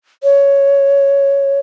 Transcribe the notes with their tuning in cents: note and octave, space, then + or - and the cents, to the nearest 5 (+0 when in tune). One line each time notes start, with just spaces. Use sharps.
C#5 +5